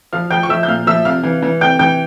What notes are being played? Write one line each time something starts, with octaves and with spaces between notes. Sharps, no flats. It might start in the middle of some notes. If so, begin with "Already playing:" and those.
F3 F5 F6
F3 G5 G6
C#6
F3 E5 E6
G6
A#2 F5 F6
F3 E5 E6
C3 F5 F6
E3
E3
C3 G5 G6
E3 G5 G6